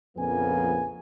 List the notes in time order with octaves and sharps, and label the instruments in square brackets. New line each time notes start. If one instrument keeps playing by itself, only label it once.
[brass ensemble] A#1 F2 C#3 A#3 B3 G#5